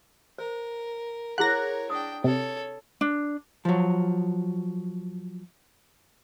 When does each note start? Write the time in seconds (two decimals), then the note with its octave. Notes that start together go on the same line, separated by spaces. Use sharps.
0.38 A#4 C5
1.38 E4 G#4 A#4 C#5 F#5 F#6 A#6
1.90 D4 G5 D#6
2.24 C3 A4 C#5
3.01 D4
3.65 F3 F#3